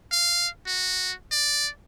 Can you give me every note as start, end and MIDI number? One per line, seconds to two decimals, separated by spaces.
0.12 0.48 77
0.67 1.13 66
1.31 1.69 74